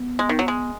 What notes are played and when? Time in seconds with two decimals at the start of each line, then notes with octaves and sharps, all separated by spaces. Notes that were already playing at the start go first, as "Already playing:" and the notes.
Already playing: B3
0.19 G#3
0.29 D#3
0.39 F#3
0.48 G#3